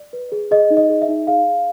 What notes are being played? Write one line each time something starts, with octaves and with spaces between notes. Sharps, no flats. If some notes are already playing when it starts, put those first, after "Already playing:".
Already playing: D5
B4
G#4
G#4 D#5
D#4
D#5
G#4
E5
D#4
G#4 F5
G#4